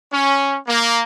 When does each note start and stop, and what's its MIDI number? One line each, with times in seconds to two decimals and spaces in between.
0.12 0.57 61
0.68 1.01 58